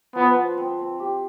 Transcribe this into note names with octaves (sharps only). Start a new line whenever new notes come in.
F3 B3
C5
C4
C4
G4